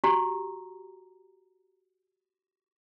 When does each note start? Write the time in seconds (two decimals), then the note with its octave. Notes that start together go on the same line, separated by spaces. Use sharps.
0.04 F#4 G4 A#5